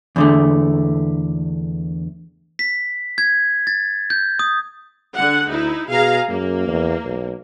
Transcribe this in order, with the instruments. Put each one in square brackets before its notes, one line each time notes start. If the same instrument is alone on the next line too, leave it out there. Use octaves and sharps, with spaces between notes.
[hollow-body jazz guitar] E2 D3 A3
[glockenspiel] B6
G#6
A6
G6
D#6
[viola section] D3 F#5
[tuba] D2 [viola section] D#4 E4
[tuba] B2 [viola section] G#4 F5 A#5
[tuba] F#2 [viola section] A#3
[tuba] E2
B1